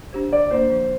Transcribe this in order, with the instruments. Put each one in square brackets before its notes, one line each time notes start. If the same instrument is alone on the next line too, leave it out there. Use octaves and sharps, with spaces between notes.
[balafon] D4 G4 C5
[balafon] D3 [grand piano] D5
[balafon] A#3 D4 [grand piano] C5
[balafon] F3